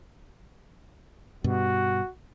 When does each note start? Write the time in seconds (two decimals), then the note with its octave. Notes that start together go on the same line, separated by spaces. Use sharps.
1.44 G2 B2 F#4